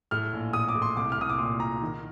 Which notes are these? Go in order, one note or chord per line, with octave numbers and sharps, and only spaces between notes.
A2 F6
A#1
A2 D#6
D6
A2
C6
C2 D6
F6
C2 D#6
D6
A#2 C6
A#2 A#5
D#3